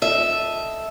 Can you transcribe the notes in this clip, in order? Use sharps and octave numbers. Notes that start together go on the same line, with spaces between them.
A4 D#5 E5